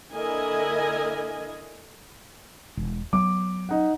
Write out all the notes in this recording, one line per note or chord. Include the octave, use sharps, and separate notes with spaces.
D3 A#3 E4 A#4 D#5 G#5
E1
F#3 B3 D6
D#4 F#5